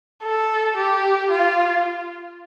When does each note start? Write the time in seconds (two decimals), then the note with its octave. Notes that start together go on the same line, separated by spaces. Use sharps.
0.23 A4
0.77 G4
1.31 F4